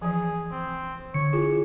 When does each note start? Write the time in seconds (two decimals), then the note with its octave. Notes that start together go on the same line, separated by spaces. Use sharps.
0.02 E3 F3 G#4
0.51 C4
1.14 D3 C#5 C#7
1.33 E4 F4 G#4